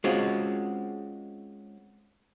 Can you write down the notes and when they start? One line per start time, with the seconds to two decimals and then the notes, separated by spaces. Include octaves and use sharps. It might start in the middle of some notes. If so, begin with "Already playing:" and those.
0.04 G#3 C4 C#4 F4 F#4